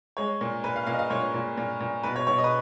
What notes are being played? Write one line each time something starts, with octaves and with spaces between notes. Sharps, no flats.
G#3 C#5
A#2
A#2 B4
F5
A#2 F5
D#5
F5
A#2 C#5
A#2
A#2
A#2
B2 B4
C#5
B2 C#5
D#5
B4